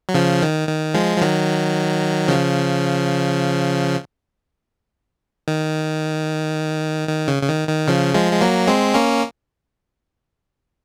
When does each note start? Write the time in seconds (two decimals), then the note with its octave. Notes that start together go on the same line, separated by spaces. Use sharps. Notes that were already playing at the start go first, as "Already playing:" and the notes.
0.09 F#3
0.14 C#3 F3
0.42 D#3
0.69 D#3
0.94 F3 G#3
1.18 F3
1.21 D#3 F#3
2.28 C#3 F3
5.48 D#3
7.09 D#3
7.28 C#3
7.43 C#3
7.48 D#3
7.68 D#3
7.88 C#3 F3
8.14 F3 G#3
8.33 G#3
8.41 F#3 A#3
8.67 G#3 C4
8.94 A#3 C#4